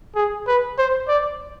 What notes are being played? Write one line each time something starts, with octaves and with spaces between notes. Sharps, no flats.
G#4
B4
C5
D5